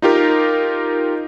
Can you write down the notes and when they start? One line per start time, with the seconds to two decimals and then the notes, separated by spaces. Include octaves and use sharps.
0.02 D#4 F4 G4 A#4